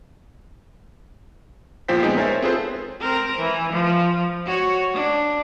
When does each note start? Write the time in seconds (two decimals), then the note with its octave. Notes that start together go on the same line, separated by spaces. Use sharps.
1.88 E2 A#2 F3 C5 G5 B6
2.02 G#3 B3 C4 D#4 G#4
2.17 A#4 C5 C#5 E5 G#5 A6
2.42 C4 F4 G#4 A4 B4 C5
3.01 C4 A#4
3.38 E3
3.72 F3
4.46 F#4 C#5
4.93 D4